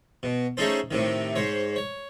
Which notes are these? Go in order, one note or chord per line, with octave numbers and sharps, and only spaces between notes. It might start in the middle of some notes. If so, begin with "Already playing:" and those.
B2
A3 C#4 D#4 G#4 A4 C5
A2 C3 D#3
G#2 C5 C#5
C#5